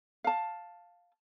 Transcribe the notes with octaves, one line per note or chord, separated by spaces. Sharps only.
F5 A5